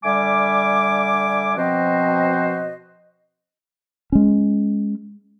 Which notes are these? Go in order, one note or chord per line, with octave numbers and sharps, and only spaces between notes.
D3 G3 E5 G#5 D6
B2 F3 C4 F#4 C5 D#5
G#3 C#4